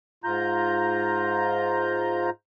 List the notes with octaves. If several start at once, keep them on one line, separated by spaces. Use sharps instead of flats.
G#2 F4 A#5 G6